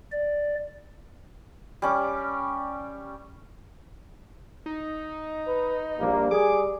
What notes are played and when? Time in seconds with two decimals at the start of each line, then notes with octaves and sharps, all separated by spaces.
0.12 D5
1.82 G3 C#4 D6
4.66 D#4
5.47 B4
6.00 A#1 G3 A#3
6.31 G#4 D6